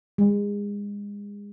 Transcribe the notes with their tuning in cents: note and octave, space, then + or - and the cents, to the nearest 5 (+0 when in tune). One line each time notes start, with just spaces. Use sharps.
G#3 -30